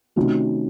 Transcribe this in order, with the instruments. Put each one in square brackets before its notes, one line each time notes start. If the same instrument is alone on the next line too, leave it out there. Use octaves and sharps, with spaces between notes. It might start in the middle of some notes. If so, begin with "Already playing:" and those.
[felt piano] C3 D#3 A3 C#4 F#4